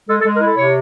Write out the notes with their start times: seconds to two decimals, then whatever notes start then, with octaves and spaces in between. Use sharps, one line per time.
0.09 G#3 A4
0.21 A4
0.25 G#3
0.34 A#4
0.41 E4
0.46 A4
0.57 C3 C#5